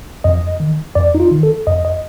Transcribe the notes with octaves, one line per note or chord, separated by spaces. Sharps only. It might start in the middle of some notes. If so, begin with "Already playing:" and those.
F2 D#5
D#3
F2 D5
D#4
F4
D#3
A4
F2 D#5
D#5